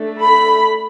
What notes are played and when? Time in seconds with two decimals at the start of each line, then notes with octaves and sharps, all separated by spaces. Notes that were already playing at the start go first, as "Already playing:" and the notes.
Already playing: A3 D4 A4
0.21 B5